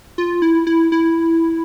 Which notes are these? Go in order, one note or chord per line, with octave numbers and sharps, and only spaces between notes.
F4
E4
E4
E4